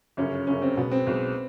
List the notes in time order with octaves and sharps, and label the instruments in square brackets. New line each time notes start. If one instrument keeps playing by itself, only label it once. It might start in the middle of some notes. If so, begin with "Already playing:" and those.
[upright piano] G1 F#2 C#3 [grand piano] C#4
[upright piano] G1 F#2 C#3 [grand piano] C#4
[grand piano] C4
[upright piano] B1 B2 G#3 [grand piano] B3
[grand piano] C4
[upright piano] B1 B2 G#3